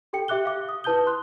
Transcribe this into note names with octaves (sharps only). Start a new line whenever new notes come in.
G4 A4 G5 C#7
G4 E5 D6 F#6 G7
F5 D6
D#6
E4 B4 A5 D#6 G6 G7
C6 F#6